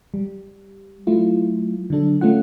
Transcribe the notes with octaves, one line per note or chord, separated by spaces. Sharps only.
G3
F#3 A3 E4 F4
D3 F#3 D4 A4
A3 C#4 F4 F#5